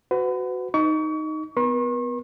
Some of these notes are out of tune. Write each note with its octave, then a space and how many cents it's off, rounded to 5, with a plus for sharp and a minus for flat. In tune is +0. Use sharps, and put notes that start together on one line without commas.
F#4 +0 B4 +35
D#4 +0 C#6 +35
B3 +25 B4 -45 C#6 -45